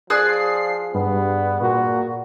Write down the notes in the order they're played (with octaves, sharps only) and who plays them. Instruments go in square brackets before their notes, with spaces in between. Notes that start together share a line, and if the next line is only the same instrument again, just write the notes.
[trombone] F3 [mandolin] G#4 D5 F#6 [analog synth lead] C7
[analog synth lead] G2 [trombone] B3
[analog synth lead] A#2 [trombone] F#4